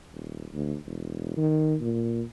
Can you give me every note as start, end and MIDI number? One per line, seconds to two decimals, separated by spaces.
0.12 0.46 27
0.53 0.76 38
0.86 1.34 28
1.37 1.75 51
1.81 2.22 46